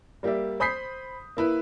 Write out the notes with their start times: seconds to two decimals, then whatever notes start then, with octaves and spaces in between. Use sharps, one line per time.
0.23 G3 A#3 G4 D5 E5
0.60 C5 B5 D#6 G6 B6 C7
1.37 A#3 E4 B4